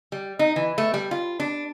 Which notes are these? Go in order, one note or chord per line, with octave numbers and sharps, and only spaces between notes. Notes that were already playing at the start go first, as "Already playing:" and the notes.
G3
D#4
E3
A3
G3
F4
D4